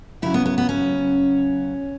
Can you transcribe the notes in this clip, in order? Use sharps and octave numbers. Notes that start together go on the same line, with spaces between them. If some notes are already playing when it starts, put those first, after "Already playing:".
C#3 F#3 E4
B3
B3
B3
C#4